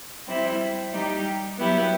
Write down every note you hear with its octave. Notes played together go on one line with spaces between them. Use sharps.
G3 C4 E4
G3 D#4 G4
F#3 B3 E4 G4